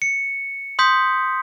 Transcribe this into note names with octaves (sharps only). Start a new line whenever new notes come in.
C#7
C6 D#6 G6 B6